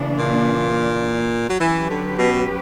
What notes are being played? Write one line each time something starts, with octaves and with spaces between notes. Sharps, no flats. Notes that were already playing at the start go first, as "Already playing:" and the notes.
Already playing: C#3 E3 A#3 D4
A#2
F#3
E3 F#3 C#4 G4 B4
D3
B2